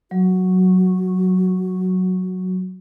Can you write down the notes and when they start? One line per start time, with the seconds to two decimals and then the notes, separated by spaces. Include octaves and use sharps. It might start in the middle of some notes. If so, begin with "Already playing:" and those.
0.11 F#3 F#4